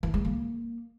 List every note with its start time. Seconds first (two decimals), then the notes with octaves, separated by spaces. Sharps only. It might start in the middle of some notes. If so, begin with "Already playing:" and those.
0.03 E3
0.14 G#3
0.25 A#3